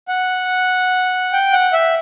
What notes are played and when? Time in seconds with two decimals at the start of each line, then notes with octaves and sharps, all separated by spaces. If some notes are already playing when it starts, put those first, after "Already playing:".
0.08 F#5
1.33 G5
1.53 F#5
1.73 E5